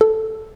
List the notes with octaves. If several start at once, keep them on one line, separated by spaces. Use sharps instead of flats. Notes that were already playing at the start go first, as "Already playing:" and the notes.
A4